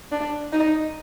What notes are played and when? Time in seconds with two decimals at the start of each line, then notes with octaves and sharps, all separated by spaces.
0.12 D4
0.53 D#4